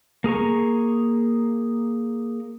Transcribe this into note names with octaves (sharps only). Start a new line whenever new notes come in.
A#3 G#4 A#5 C#6